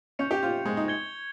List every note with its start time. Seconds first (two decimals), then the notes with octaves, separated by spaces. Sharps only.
0.19 C#4 C#6 G6 C#7 F7
0.31 G4
0.43 F4
0.65 G#3
0.77 D#4
0.88 G#6 C#7 G7